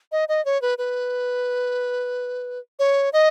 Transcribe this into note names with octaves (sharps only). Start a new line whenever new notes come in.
D#5
D#5
C#5
B4
B4
C#5
D#5